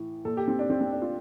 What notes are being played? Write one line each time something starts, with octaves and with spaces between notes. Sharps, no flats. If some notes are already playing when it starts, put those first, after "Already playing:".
Already playing: A2 E3
A#2 A4
G4
C4
D4
C4
C4
D4
F4